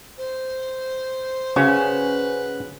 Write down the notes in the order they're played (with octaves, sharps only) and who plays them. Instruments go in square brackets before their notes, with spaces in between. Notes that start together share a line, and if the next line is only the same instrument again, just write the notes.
[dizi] C5
[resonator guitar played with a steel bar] C#3 [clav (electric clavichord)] C#4 F#4 G#5 [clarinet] B4